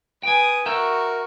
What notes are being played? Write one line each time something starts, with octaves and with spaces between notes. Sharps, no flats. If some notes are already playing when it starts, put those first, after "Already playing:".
B4 G5 G#5 D#6
F#4 A#4 E5 G5 C#6